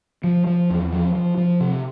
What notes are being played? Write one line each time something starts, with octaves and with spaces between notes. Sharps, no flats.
F3
F3
E2
F3
F3
F3
C3